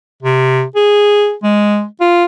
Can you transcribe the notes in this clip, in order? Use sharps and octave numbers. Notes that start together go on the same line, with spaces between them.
C3
G#4
G#3
F4